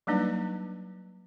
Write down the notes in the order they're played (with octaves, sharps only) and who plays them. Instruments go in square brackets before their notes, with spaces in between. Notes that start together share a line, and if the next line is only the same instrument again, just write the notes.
[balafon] F#3 G3 A#3 D4 D#4 B4